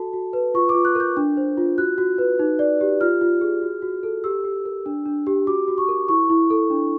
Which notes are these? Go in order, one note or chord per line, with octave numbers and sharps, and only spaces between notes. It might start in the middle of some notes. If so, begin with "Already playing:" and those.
Already playing: F#4 A4 A5
F#4
B4
F4 C#6
D6
F4
F#6
A#4 G6
D4
C5
F4
F#4 F#6
F#4
B4
D#4
D5
G4
F4 F6
F4
G#4
F#4
F#4
A4
G4 E6
G4
A#4
D4
D4
G4
F#4 D6
F#4
C#6
A#4
E4 C#6
E4
A4
D4